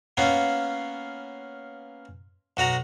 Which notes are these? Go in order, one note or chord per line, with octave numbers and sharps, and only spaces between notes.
A#3 B3 C#4 F4
B1 F#4 F#5 A#5